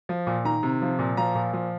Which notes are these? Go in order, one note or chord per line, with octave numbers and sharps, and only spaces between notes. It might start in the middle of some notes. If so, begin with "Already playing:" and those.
F3
A#2
D#3 A#5
C3
F3
A#2
F3 A#5
A#2
F3